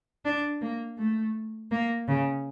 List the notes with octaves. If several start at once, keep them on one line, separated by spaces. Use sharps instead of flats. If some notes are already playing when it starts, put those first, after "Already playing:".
D4
A#3
A3
A#3
C#3